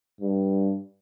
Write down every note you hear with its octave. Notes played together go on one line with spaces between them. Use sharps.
G2